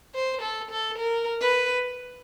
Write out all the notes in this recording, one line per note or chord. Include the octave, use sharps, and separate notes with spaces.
C5
A4
A4
A#4
B4